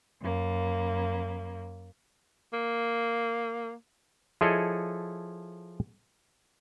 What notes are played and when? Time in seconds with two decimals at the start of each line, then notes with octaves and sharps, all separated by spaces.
0.22 F#2 A#3
2.53 A#3
4.41 F3 E4 G#4 A4 C#5 D#5